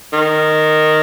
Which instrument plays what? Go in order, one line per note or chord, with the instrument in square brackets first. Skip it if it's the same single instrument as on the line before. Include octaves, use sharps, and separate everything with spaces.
[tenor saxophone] D#3